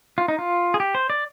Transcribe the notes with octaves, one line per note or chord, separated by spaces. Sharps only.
F4
D#4
F4
G#4
G4
C5
D5